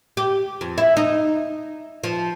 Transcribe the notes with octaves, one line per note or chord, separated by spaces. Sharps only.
G4
F2
E4
D#4
F3